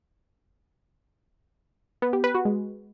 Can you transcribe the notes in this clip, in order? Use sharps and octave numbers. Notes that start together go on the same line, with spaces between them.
B3
G4
B4
F#4
G#3